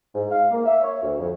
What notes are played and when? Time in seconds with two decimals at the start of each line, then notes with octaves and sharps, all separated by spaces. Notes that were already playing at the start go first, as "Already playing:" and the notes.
0.15 G#2
0.31 F5
0.51 A#3
0.65 E5
0.81 C#5
1.02 D2
1.18 F2